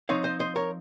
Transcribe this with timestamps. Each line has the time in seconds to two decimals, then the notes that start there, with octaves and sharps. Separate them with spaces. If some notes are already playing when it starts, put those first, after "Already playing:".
0.09 F3 C4 D#4 C#5 F5
0.24 C5 D#5
0.40 C5 D#5
0.56 A#4 C#5